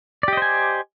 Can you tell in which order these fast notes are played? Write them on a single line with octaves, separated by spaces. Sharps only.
D5 G4 D#5 C5 G#5